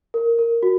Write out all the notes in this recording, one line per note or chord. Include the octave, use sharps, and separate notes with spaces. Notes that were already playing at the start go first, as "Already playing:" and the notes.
A#4
A#4
F#4